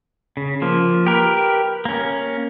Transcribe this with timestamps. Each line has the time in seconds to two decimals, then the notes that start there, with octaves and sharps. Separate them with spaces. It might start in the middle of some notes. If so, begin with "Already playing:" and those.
0.37 C#3
0.62 F3 A#3
1.06 G4 A#4 B4
1.85 A#3 C#4